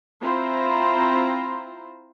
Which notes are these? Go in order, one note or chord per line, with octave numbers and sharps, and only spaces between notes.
C4 E4 F4 C5 A#5